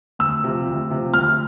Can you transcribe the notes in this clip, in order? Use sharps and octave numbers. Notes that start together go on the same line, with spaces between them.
D2 E6
C3 F3
D2
C3 F3
D2 F6